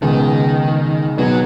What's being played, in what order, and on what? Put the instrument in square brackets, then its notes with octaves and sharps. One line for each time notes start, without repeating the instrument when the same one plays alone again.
[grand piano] C#2 B2 G#3 [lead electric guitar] D#3
[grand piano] B2 B3 D#4 G#4 [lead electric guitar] F#3